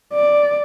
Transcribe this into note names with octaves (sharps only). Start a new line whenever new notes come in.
D5